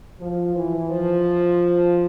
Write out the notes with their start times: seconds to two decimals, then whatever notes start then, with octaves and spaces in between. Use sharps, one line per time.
0.20 F3
0.55 E3
0.90 F3